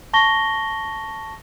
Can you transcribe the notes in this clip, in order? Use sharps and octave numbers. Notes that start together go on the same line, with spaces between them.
A5 C#6 A#6 G7